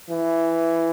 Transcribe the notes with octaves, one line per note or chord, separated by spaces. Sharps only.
E3